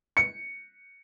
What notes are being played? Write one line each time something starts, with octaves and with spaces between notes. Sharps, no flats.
C#7